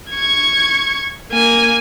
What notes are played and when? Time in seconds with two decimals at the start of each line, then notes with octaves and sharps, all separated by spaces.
0.11 C#6 G#6
1.32 A#3 G#5